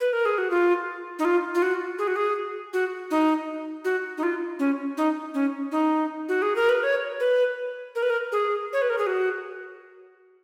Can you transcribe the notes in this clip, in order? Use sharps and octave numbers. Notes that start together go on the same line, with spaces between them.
B4
A#4
G#4
F#4
F4
D#4
F4
F4
F#4
G#4
F#4
G#4
F#4
D#4
F#4
D#4
F4
C#4
D#4
C#4
D#4
F#4
G#4
A#4
B4
C#5
B4
A#4
B4
A#4
G#4
C#5
B4
A#4
G#4
F#4